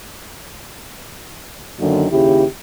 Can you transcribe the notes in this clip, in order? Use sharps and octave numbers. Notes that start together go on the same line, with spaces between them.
F#2 D3 D#3 A#3
D#2 C#3 E4 G4